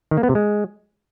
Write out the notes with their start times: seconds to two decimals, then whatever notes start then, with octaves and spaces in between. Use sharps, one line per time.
0.11 D#3
0.17 A#3
0.23 B3
0.29 C3
0.35 G#3